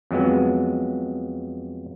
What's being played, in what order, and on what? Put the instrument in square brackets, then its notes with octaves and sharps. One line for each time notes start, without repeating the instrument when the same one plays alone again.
[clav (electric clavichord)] F2 F#3 G#3 B3